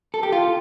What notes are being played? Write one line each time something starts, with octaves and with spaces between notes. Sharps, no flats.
A4
G4
F4